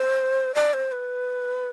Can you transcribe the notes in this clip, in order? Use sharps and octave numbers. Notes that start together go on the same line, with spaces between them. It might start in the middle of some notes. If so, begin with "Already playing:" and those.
Already playing: C5
D5
C5
B4